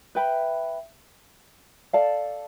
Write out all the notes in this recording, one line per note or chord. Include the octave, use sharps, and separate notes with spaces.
B4 E5 G5 B5
A4 D5 F5 A5